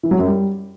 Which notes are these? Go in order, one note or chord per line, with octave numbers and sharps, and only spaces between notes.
E3
F#3
F#2
G3